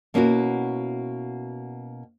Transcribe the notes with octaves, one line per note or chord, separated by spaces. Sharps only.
B2 A#3 C#4 D#4 E4 F#4